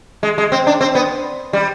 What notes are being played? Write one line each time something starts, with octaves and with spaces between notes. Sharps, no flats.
G#3
G#3
C4
D4
C4
B3
G3